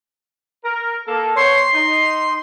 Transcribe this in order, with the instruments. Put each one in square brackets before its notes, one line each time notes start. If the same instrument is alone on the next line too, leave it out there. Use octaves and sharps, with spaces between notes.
[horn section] A#4
A#3 A4
[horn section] B3 C5 C#5 [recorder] C6
[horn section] D#4